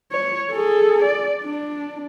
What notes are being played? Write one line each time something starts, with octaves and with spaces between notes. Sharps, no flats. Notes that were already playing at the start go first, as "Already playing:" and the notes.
C#5
G#4 A4
D5
D4